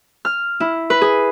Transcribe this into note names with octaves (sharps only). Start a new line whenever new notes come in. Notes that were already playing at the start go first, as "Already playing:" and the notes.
F6
E4
B4
G#4